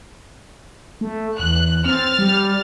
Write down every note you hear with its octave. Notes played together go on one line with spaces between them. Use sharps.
A3
E2 F#6
C4 F6 A6
G3